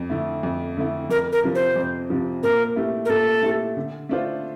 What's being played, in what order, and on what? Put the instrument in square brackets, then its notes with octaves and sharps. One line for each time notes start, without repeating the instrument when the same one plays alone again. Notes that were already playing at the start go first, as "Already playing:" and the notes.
Already playing: [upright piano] F2
D3 A3 E4
F2
D3 A3 E4
[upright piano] F2 [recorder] A#4
[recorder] A#4
[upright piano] C3 F3
[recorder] C5
[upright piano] F2
C3 F3
[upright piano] A#2 [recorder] A#4
[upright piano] A3 E4 G4
[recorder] A#4
[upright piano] A#2 [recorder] A4
[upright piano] A3 E4 G4
D3
A3 D4 F4 C5